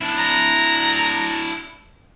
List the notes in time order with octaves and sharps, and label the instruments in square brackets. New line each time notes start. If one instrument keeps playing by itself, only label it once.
[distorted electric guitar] D4 E4
[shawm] A#5